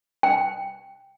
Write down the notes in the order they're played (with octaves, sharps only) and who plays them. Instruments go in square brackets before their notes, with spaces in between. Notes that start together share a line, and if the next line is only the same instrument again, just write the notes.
[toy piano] G5